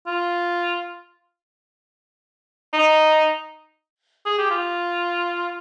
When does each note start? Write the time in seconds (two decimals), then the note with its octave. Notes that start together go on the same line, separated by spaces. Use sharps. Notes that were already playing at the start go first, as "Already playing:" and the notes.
0.06 F4
2.73 D#4
4.26 G#4
4.38 G4
4.51 F4